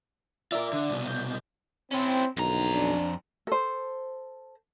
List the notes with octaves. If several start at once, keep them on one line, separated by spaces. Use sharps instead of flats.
F4 A#4 D5 E5
D3
C2 B2
G6
C4 C#4 E4
B1 F2 A#2 D3 D#3 A#5
D4
A4 C5